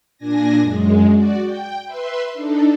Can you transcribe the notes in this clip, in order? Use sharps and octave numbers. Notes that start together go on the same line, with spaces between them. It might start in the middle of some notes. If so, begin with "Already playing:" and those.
A#2 D4 G#5 A#6
F#2 G#3
F#4 D5
G5
B4 E5 C6
D4 D#4 A4